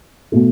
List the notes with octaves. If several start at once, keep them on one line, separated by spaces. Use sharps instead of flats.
B2 A3